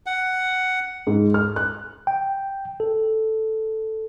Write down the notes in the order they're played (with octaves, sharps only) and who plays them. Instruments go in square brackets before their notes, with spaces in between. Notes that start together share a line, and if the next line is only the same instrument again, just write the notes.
[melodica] F#5
[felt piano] G#2
F6
F#6
[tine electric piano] G5
A4